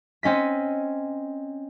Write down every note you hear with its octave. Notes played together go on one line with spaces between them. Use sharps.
C4 C#4 D#5 B6